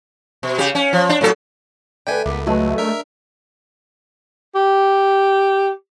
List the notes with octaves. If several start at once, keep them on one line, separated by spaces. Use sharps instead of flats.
B2
C#3 G4
C#4
F3
D4
A2 F#3 A4
D3 A3 B4 D5 G5 G#5
C#2 A3 B3 A#4 D6
F#3 G#3 A3 B4
D4 A#4 E5
G4